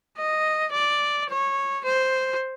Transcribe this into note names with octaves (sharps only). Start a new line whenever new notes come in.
D#5
D5
C#5
C5